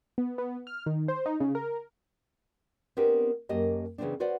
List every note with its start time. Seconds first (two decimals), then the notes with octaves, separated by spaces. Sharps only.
0.18 B3
0.38 B3
0.67 F6
0.86 D#3
1.08 C5
1.26 D#4
1.40 C#3
1.55 A#4
2.97 B3 C4 D4 G4 A#4 B4
3.49 F#2 A#3 G4 D#5 A5
3.98 C#3 E3 F3 B3 C4 D4
4.20 F#4 B4 C5 D5 F#5